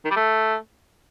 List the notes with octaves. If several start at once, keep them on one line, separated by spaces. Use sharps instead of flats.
D#3
G3
A3